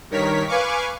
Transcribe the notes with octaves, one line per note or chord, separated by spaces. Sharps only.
G2 D#3 A#4 C#5 B6
B4 F5 G#5 C#6 D6